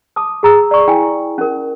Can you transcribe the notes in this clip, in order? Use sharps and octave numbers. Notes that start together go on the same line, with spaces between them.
A5 D6 D#6
G#4 A#5 E6
D5 C#6
E4 G5 G#5
C#4 A#4